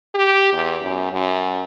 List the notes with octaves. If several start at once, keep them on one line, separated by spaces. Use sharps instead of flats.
G4
E2
F#2
F#2